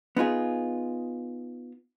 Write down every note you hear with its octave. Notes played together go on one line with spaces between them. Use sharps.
B3 D#4 F4 G#4